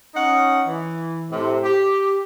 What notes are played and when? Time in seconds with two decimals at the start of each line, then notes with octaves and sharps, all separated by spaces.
0.15 C#4 D#4 F#5
0.68 E3
1.31 A2 C3
1.63 G4